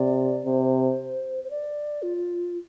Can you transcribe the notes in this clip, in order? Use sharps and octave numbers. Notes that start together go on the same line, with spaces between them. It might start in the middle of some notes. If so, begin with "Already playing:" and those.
Already playing: C3 D5
C3 C5
C5
D5
F4